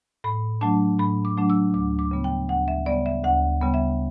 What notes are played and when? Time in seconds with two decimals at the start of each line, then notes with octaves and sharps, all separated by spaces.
0.24 A2 B5
0.61 F#3 A3 D4 A5
0.99 A2 B5
1.25 D6
1.37 F#3 A3 D4
1.50 E6
1.74 D2 D6
1.99 D6
2.11 C#3 G3 B3
2.24 G5
2.49 D2 F#5
2.68 E5
2.86 C#3 G3 B3 D5
3.06 E5
3.24 D2 F#5
3.62 C#3 G3 B3
3.74 E5